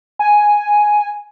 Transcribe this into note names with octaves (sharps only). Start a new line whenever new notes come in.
G#5